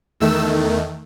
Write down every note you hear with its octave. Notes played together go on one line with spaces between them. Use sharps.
E2 D#3 A3 E6